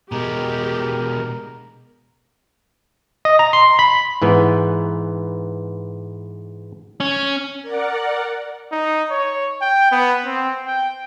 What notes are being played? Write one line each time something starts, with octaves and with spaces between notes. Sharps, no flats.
B2 G#3 G4 A#4
D#5
A#5
C6
B5
G#2 E3 B3
C#4
A#4 D5 F#5
D#4
C#5
G5
B3
C4
G5